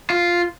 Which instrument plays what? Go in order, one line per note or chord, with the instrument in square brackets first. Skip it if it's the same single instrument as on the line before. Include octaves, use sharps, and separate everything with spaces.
[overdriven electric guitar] F4